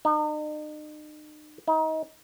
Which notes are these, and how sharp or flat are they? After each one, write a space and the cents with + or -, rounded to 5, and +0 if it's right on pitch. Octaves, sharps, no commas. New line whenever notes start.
D#4 -40
D#4 +30